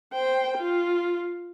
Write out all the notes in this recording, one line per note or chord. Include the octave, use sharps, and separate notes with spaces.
C5 G5
F4